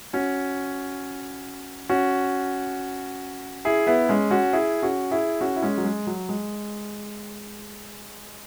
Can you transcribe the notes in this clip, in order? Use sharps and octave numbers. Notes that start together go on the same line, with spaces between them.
C#4 F#4
C#4 F#4
E4 G#4
B3 E4
G#3 C#4
C#4 F#4
E4 G#4
C#4 F#4
E4 G#4
C#4 F#4
E4
G#3 C#4
F#3
G#3
F#3
G#3